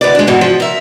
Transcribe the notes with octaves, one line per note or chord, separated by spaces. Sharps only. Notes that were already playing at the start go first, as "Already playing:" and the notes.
D2 B4 D5
G#3 D4
G#2 B2 E3
F3
A#4 E5